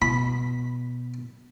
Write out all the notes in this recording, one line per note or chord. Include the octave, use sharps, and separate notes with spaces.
B2 B5